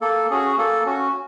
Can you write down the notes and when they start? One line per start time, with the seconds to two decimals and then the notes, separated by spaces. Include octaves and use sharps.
0.01 A#3 A4
0.30 C#4 F#4 G#4
0.58 A#3 A4
0.86 C#4 F#4